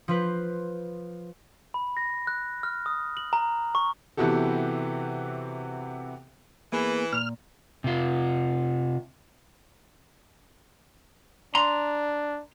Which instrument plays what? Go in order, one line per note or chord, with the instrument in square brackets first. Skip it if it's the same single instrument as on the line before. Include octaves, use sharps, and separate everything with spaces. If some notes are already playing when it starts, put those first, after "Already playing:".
[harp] F3 F4 B4 C5
[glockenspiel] B5
A#6
F#6
F6
D#6
F#7
A#5
C#6
[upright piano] C3 E3 B3 F#4 G4 A4
[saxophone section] E3 [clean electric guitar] A#3 B3 G#4
[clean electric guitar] A#2 [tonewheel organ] F6
[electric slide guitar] C3 F4
[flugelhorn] D4 [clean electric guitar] A#5 C6